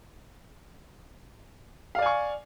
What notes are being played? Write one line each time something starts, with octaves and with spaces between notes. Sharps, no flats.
D5 F5 G#5 C#6